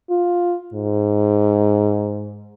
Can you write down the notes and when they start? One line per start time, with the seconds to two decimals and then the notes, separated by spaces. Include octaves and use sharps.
0.10 F4
0.74 G#2